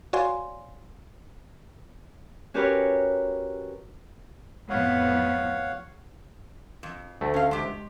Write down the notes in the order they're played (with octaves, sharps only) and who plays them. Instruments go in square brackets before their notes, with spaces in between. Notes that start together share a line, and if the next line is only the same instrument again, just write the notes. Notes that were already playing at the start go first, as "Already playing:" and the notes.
[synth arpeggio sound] F#4 C#5 D5 F5 G#5 C6
[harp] C#4 F#4 G4 A#4 B4 C#5
[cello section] F2 A2 B3 [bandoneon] C#5 F5 F#5
[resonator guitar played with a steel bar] F2
[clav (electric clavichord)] D2 A3
[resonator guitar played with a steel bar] C#4 F5
G#3 G4